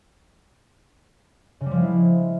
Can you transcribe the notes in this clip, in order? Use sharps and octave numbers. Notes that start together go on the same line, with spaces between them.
C#3
G3
F3
G#3
E4